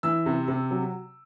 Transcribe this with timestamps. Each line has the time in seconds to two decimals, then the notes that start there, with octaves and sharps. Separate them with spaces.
0.03 E3 E6
0.26 C3
0.48 C3
0.71 F#3